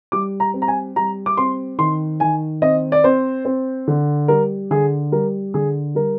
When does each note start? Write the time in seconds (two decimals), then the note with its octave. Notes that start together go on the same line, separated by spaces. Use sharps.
0.12 G3 D6
0.40 A#5
0.54 C4
0.62 A#5
0.68 G#5
0.96 G3 A#5
1.26 D6
1.37 C4 C6
1.78 D#3 C6
2.20 D#3 G#5
2.62 C4 D#5
2.92 D5
3.04 C4 C5
3.45 C4
3.87 D3
4.28 G3 A#4
4.71 D3 G#4
5.12 G3 A#4
5.54 D3 G#4
5.95 G3 A#4